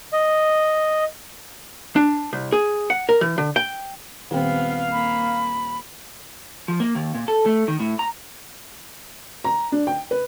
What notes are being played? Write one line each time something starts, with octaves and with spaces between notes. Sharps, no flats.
D#5
D4
C2
G#4
F#5
A#4
E3
D3
G5
D#1 B3 C4 F5
A#3 B5
F3
A#3
D#2
A#2
A4
A3
D#3
A2
A#5
A#5
D4
G5
B4